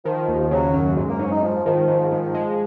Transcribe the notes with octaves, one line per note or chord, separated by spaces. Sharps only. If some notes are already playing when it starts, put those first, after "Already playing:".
D#3 F3
D#2
F3
C#3 F#3
F#2
G#2 G#3
A#3
G#2 C#4
D#4
G#2 F3
D#3 F3
G#2
G#2
G#3